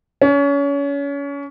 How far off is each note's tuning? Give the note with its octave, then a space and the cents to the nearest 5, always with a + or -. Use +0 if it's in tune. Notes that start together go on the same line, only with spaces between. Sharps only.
C#4 +30